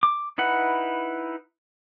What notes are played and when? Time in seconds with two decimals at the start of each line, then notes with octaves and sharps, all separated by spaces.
0.03 D6
0.38 D#4 E4 B4 F#5